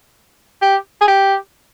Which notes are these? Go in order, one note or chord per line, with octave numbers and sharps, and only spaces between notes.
G4
G#4
G4